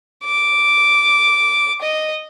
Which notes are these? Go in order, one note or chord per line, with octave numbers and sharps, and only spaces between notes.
D6
D#5